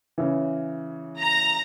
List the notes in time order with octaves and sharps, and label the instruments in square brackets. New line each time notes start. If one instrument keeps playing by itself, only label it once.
[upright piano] C#3 E3
[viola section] A#5